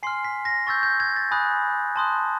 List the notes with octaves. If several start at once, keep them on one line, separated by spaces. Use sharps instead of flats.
G#5 C6 F6 C7
B6
A#6
C#6 E6 G6 A6
G6
G#6
A6
G#5 B5 D#6 F#6
A5 C6 D#6 F#6